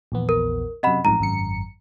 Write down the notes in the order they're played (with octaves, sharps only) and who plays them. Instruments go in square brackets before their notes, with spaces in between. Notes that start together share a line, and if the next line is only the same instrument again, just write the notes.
[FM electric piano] A#1 E2 B3
[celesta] A#4
[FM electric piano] F#2 C3 [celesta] D#5 F#5 B5
[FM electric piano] A1 F2 G#2 [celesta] A#5
[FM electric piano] G#1 F#2 C#7